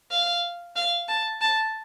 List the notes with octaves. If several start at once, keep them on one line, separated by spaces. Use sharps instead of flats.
F5
F5
A5
A5